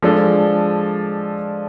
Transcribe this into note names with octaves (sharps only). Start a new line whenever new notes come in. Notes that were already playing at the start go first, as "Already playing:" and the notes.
F3 G#3 D4 A4